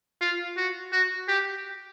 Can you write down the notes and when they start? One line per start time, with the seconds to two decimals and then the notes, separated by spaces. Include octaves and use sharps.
0.21 F4
0.57 F#4
0.92 F#4
1.28 G4